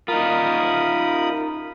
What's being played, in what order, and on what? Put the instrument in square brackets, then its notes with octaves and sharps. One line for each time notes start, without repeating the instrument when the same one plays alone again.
[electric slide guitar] D#4 F4 [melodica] A#4 B5 D#6